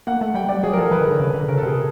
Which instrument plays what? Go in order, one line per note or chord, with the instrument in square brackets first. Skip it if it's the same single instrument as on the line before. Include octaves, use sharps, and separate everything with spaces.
[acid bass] A#3 [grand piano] F#5
[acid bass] A3
[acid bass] G3 [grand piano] G5
[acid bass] G3 [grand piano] D5
[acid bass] F#3 [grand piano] G#4
[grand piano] A#4
[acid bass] F3 [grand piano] A4
[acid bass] E3 [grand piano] B4
[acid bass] D#3
D3
C#3
D3
[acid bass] C#3 [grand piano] A#4
[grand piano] A4
[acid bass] C3 [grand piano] G#4